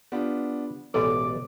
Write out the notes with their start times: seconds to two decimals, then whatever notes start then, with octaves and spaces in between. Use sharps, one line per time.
0.12 B3 D4 F4 G4
0.94 A1 B2 G#3 A4 B4 D5 D6